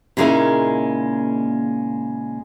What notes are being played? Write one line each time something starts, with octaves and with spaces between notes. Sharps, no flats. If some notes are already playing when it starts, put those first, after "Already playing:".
A#2 C#3 G#3 A#3 D#4 E4